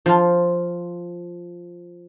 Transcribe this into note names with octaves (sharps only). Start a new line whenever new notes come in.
F3 F4